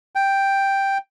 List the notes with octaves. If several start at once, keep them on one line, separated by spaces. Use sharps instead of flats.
G5